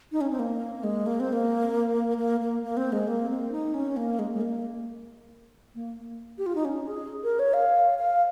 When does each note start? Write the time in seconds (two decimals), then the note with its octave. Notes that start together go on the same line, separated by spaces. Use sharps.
0.12 D#4
0.21 C#4
0.30 C4
0.39 A#3
0.84 G#3
1.06 A#3
1.20 C4
1.33 A#3
2.18 A#3
2.40 A#3
2.63 A#3
2.77 C4
2.92 G#3
3.07 A#3
3.30 C4
3.52 D#4
3.74 C#4
3.97 A#3
4.19 G#3
4.34 G#3
4.41 A#3
5.75 A#3
6.38 G4
6.46 F4
6.55 D#4
6.65 C#4
6.87 G#4
7.24 A#4
7.39 C#5
7.54 F5
7.99 F5